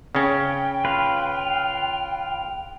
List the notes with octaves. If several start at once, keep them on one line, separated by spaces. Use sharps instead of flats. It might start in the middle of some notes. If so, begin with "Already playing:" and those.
C#3 C#4 G5
F4 B4 F6